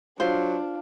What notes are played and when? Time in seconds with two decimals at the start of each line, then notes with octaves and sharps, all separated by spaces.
0.20 F#3 D4 F4 C5